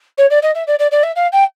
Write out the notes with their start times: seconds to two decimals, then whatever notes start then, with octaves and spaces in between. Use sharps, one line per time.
0.18 C#5
0.30 D5
0.43 D#5
0.55 E5
0.67 D5
0.79 D5
0.92 D5
1.03 E5
1.16 F5
1.33 G5